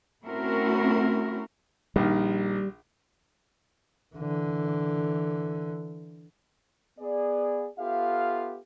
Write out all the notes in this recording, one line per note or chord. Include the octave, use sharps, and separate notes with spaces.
A3 C4 C#4 E4 F#4 A#4
A#1 D#3 G3
D3 E3
B3 G#4 D5
B3 F4 G4 A4 E5 F5